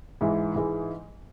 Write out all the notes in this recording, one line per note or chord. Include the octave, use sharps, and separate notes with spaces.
G#2 E3 G#3 E4
G#2 E3 G#3 E4